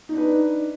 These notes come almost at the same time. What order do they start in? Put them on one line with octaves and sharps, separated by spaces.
D#4 D4 B4